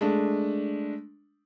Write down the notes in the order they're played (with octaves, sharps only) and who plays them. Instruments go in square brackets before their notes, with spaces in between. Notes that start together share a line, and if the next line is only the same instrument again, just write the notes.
[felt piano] G#3 A3 D4